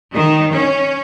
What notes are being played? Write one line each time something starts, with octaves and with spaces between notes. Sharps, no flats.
D#3
C#4